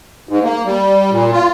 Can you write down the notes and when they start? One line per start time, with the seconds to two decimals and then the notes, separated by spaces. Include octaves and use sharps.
0.29 G#2
0.44 A#3
0.65 G3
1.11 A#2
1.32 F4